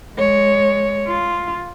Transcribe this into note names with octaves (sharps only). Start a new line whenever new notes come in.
G#3 C#5
F4